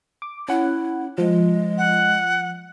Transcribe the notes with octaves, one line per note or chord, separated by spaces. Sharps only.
D6
C#4 E4 F#5
F3 G#3
F#5